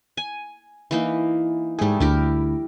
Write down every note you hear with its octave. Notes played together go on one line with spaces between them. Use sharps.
G#5
E3 A#3 D#4
G#2 G3 A3 G#4
D2 E4 G4 A#4